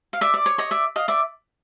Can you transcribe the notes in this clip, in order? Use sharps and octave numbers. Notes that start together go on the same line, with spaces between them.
F5
D5 E5
D5
C#5
C#5 D#5
D5 E5
D#5 F5
D5 E5